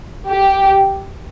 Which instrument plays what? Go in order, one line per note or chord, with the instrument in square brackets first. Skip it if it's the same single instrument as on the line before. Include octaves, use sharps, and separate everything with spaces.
[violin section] G4